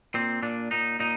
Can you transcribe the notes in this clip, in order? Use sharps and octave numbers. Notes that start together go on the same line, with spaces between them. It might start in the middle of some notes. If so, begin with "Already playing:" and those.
A#2 C4
A#2 D4
A#2 D#4
A#2 D#4